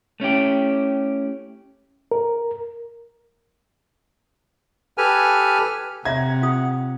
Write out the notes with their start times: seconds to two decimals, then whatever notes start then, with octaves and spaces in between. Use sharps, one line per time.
0.20 A3 C#4 E4 G4
2.11 A#4
4.98 G4 A4 B4 G#5 F6
6.05 C3 C#5 E5 F#5 A#5 G#6
6.42 F4 D#6